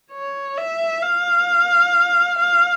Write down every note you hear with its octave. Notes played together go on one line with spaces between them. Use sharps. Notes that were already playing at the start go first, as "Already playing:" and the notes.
C#5
E5
F5
F5